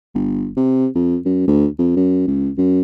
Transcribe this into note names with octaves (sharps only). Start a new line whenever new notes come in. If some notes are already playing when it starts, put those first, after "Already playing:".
G1
C3
F2
F#2
D2
F2
F#2
C#2
F#2